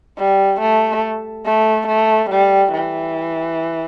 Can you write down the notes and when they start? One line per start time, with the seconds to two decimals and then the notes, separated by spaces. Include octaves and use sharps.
0.18 G3
0.60 A3
1.45 A3
1.88 A3
2.30 G3
2.72 E3